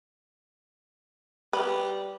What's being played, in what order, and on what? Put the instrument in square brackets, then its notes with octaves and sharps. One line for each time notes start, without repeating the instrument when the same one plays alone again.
[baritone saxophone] G3 [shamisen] B4